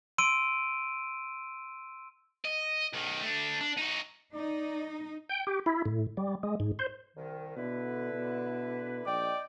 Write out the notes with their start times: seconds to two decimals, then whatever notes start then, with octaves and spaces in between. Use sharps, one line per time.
0.18 C6 E6 D7 D#7
2.45 D#5
2.93 B1 D#3
3.22 A3 D4
3.61 D4
3.78 D#4 F#4
4.34 D#4 D5
5.29 G5
5.47 G4
5.66 E4
5.85 A2
6.17 G3
6.43 G#3
6.60 G#2
6.79 C5
7.16 C2 D#3
7.57 B2 D3 E4 B4
8.13 B2
9.06 A#1 D5 D#5 G5